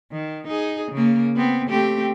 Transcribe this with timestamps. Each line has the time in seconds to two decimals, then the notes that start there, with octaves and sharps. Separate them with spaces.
0.12 D#3
0.47 D#4 G#4
0.92 C#3 A#3
1.36 B3 C4
1.69 A3 C4 G4